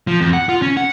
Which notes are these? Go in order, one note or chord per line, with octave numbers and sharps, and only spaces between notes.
F3
F2
F#5
F4
C#4
F#5